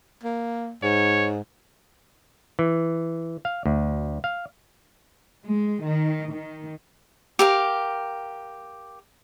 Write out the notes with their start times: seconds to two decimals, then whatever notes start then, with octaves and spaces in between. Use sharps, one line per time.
0.23 A#3
0.83 G#2 C#5
2.59 E3
3.45 F5
3.66 D2
4.24 F5
5.44 G#3
5.81 D#3
6.31 D#3
7.39 G4 A#4 F5